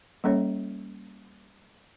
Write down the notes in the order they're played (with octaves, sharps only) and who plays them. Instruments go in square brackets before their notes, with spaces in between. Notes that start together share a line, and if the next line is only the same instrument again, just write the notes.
[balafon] G3 A#3 C#4 A4 C#5 E5